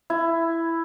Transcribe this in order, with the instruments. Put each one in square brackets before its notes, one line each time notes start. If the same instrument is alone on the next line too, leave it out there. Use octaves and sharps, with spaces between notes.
[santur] E4